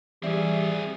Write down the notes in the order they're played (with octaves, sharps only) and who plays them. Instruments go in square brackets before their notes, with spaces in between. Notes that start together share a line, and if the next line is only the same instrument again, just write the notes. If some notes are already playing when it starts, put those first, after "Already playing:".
[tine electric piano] E3 D5 E5 [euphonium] G3 [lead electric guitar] C4 G#4